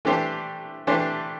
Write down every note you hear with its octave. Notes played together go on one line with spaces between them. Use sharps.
E3 A3 D4 G4 C5
E3 A3 D4 G4 C5